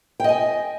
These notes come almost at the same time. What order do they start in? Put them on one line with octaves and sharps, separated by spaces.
G5 D#5 G#5